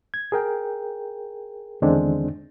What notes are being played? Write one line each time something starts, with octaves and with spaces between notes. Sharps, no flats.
G#6
G#4 A#4 G5
E2 D3 D#3 G#3 C4 D4